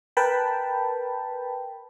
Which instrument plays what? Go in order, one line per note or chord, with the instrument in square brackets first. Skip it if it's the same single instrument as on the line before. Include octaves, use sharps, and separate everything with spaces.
[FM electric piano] A#4 B4 G5 A5 B5